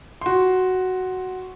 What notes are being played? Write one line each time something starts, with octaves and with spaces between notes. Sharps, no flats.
F#4 C6